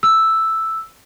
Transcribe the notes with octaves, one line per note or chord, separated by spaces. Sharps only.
E6